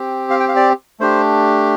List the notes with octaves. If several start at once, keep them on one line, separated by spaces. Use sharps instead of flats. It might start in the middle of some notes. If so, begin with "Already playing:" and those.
Already playing: C4 G4
F5
G5
F5
D5
A3 D4 G4 C5